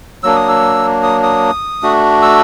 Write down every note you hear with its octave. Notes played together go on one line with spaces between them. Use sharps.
F#3 A#3 D4 E6
D#6
E6
D#6
D#6
A3 D4 F#4
E6